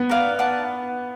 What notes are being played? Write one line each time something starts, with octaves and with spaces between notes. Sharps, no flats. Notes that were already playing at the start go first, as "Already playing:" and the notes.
Already playing: B3
A#4 D5 F5
D5 F#5 A5